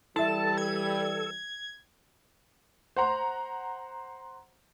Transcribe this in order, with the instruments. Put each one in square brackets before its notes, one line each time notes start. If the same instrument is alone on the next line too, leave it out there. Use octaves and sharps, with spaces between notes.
[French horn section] E3 G3 [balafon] E4 E5 [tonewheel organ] A4 [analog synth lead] A5
[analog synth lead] G#6
[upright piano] C5 F#5 A#5 C6